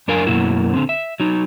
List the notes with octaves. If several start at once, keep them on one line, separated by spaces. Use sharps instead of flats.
F#2 D4 A#4 F5 G#5
F#2 B2 A#3 E4 F#4
D3 C4
E5
F#3 D#4